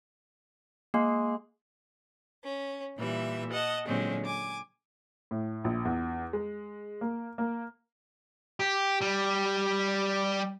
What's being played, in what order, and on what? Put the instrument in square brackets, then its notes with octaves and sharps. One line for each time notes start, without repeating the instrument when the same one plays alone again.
[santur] G#3 [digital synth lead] A#3
[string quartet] C#4
A#2 E3 G3 E5
D#5 F#5 A5
A#2 D3 F#3 G#3 C4 C#4
G#5 D6
[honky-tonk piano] A2
A#1
E2
G#3
A#3
A#3
[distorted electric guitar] G4
G3